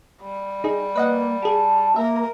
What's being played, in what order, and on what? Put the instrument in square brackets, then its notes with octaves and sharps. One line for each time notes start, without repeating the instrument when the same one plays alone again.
[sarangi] G3
[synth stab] D#4 G#4
[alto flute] A#3 [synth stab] B4 D#5 F#5
[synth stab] G4 G#4 [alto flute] A5
[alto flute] A#3 [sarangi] A#4 [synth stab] E5